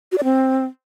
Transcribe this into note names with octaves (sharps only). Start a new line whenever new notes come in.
F#4
D5
C4